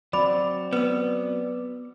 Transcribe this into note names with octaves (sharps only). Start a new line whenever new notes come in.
F#3 C4 D5 B5
B3 B4 E6